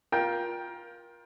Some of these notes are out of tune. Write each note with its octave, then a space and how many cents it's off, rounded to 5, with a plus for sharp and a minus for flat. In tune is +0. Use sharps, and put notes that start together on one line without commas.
F4 +10 A#4 +25 G5 +0